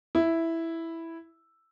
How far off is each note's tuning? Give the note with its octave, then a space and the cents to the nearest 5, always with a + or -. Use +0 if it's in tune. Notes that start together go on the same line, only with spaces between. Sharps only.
E4 +0